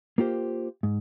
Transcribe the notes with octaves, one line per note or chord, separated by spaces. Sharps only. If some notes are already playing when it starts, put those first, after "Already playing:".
A#3 F4 G4 C5
G#2